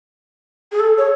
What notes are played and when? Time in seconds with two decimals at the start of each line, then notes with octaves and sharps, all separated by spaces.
0.72 G#4
0.79 A4
0.98 C#5